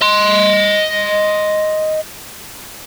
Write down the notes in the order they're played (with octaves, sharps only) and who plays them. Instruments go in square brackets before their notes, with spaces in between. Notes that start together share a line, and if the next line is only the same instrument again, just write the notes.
[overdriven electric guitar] D#5 C6